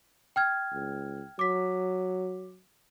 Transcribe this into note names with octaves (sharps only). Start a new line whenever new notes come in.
G5 F6 G#6
C#2
F#3 D6 B6